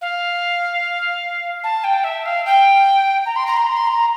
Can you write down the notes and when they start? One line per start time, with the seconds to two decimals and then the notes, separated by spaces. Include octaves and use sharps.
0.01 F5
1.64 A5
1.84 G5
2.04 E5
2.26 F5
2.46 G5
3.26 A#5
3.36 C6
3.47 A#5
3.57 C6
3.66 A#5
3.77 C6
3.87 A#5